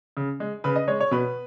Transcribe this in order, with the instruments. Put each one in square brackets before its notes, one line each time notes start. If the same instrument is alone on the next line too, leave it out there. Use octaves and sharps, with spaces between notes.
[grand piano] C#3
G#3
C#3 B4
D#5
G#3 C#5
C#5
B2 B4